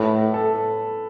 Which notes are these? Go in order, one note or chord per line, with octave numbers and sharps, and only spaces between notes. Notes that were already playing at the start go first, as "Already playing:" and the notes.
Already playing: A2 B4
A4